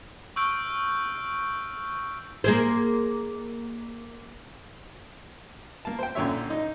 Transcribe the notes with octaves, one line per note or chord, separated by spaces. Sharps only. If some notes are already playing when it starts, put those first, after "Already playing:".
C#6 E6 F6 G6 D7
A#3 G#4 C5
A#3 A5
C5 G5
F#2 A#2 D3 C#5 E5
D#4